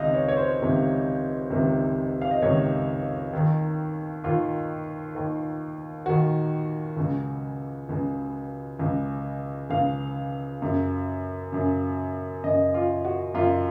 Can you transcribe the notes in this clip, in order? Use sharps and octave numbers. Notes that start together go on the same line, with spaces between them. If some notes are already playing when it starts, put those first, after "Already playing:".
Already playing: C#2 C3 D#3 D#5 F5
C#5
C#5
C5
C#2 C3 D#3
C#2 C3 D#3
F5
D#5
C#2 C3 D#3 C#5
D#2 D#3
D#2 D#3 F4
D#2 D#3
D#2 D#3 F#4
C#2 C#3
C#2 C#3
C#2 C#3
C#2 C#3 F5
F#2 C#3
F#2 C#3
F#2 C#3 D#5
F4
F#4
F#2 C#3 F4